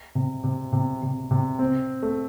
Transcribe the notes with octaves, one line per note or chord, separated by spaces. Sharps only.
C3
C3
C3
C3
C3
C4
A3